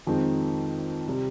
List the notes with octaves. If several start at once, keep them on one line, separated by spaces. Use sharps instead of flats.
F2 D#3 G#3 C4 D#4
C3 G3